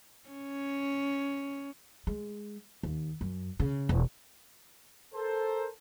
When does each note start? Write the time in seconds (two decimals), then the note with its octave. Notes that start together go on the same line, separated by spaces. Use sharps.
0.29 C#4
2.07 G#3
2.83 D#2
3.21 F#2
3.60 C#3
3.89 E1
5.14 A4 A#4 C5